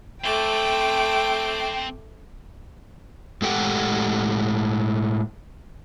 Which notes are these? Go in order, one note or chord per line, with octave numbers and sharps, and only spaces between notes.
A3 C4 A4 G5 D6
A2 G#3 G4 A4 F#5 G5